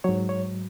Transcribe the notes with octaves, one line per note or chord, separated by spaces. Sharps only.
G#2 F#3 C#5
C#5